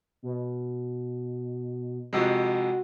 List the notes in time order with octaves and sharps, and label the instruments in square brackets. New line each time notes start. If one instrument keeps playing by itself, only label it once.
[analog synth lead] B2
[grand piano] F2 C3 G#3 [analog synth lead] F#4